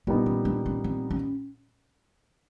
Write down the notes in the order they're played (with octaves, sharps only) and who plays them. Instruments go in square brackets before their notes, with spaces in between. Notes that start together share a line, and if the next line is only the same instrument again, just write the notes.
[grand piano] A#2 G3 B3 D#4 [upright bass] D4
[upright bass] C#4
D4
C#4
C4
C#4